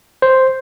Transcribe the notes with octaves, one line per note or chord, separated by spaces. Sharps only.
C5